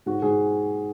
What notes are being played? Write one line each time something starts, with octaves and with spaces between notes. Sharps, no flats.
G#2 F#4
G#2 G#4